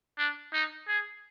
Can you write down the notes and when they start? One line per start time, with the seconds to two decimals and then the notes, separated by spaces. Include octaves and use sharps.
0.18 D4
0.53 D#4
0.88 G#4